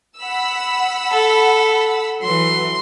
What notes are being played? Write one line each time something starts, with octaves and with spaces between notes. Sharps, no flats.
F#5 B5 E6
A4
E3 F#3 C6